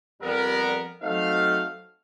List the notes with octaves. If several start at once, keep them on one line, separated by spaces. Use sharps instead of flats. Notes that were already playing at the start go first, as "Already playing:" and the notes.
F2 G3 B3 A#4
F#3 A3 C4 D#4 F#4 F5